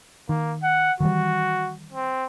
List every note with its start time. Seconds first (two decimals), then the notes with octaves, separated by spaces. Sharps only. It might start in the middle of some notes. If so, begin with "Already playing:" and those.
0.29 D#3 A#3
0.63 F#5
1.00 D#3 E3 G3 F#4
1.93 C4